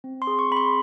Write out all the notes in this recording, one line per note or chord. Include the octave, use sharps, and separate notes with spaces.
C4
C6
G#4
C#6
C4 B5
C6